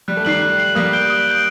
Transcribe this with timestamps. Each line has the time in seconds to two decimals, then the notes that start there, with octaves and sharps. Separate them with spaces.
0.08 G3 F#6
0.17 A3
0.25 D#3 G3 C7 F#7
0.42 F#6
0.58 C7 F#7
0.75 G3 A#3 D#6
0.93 G6 D7 G7
1.10 D#6
1.26 G6 D7 G7